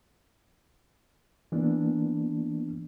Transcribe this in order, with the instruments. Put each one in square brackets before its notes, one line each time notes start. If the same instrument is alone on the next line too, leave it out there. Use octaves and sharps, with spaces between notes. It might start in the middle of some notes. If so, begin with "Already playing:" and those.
[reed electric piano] E3 A#3 B3 D4